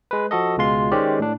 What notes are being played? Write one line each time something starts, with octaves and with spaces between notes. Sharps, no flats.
G#3 B4
F3 F#4 A4 D#5
C#2 B2 G#3 F4 C6
D#3 G#3 C#4 G4 C5 D5
A2 D4